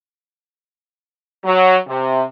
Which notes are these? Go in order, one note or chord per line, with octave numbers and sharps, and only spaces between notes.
F#3
C3